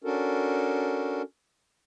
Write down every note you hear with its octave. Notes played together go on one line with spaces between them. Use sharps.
C#4 D4 F#4 A4 A#4